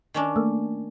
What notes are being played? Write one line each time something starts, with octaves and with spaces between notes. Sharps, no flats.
D#3 C#4 D4
A3 A#3